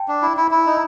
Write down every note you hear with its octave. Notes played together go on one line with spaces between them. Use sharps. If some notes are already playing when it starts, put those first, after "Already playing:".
Already playing: G5 A5
D4
E4
E4
E4
D#4